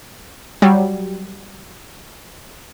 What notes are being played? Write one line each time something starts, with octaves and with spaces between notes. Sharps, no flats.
F#3 G3